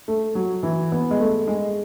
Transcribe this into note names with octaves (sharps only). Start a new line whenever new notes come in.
A3
F#3
E3
B3
G#3
A3
G#3